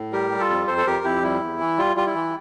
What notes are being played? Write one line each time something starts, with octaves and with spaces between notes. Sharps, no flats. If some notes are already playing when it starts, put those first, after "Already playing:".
Already playing: A2
G3 G4 A#4
G3
F4 A4
F2
F2 A4 C5
A4
F2 G4 A#4
F2 E4 G4
G3 E4
E2
E3
G3 F4
G3 F4
E4
E3